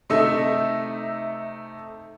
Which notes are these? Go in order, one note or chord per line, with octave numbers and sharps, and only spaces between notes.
C3 A3 D#4 A4 E5 E6